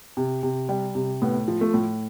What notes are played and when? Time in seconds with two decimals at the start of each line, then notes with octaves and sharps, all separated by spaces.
0.17 C3
0.43 C3
0.69 G3
0.95 C3
1.22 A2 B3
1.48 F3
1.61 A3
1.74 A2